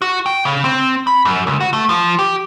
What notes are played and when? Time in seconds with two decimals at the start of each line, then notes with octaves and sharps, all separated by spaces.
0.02 F#4
0.26 G5
0.45 C#3
0.64 C4
1.07 B5
1.25 F#2
1.47 C#2
1.61 F#4
1.73 A3
1.89 F3
2.19 G4